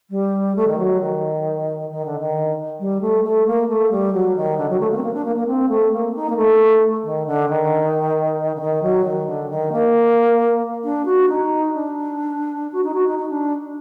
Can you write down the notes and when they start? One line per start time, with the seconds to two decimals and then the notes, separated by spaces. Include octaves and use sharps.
0.10 G3
0.56 A3
0.67 D#3
0.78 F#3
1.01 D#3
1.90 D#3
2.05 D3
2.20 D#3
2.79 G3
3.01 A3
3.24 A3
3.47 A#3
3.68 A3
3.91 G3
4.13 F#3
4.36 D#3
4.57 D3
4.69 F#3
4.80 A3
4.91 A#3
4.97 C4
5.03 A#3
5.14 D4
5.25 A#3
5.36 A#3
5.47 C4
5.69 A3
5.92 A#3
6.15 D#4
6.29 A#3
6.37 A3
7.04 D#3
7.26 D3
7.49 D#3
8.55 D3
8.61 D#3
8.82 F#3
9.04 D#3
9.26 D3
9.50 D#3
9.72 A#3
10.84 D4
11.05 F#4
11.29 D#4
11.73 D4
12.72 F#4
12.84 D#4
12.94 F#4
13.08 D#4
13.19 D#4
13.29 D4